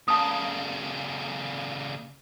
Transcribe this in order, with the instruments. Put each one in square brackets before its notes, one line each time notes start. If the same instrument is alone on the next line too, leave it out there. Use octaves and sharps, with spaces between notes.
[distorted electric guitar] A#2 C#3 [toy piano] A5 D#6